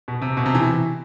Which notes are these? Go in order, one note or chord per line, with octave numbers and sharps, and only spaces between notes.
B2
C3
B2
C3
E3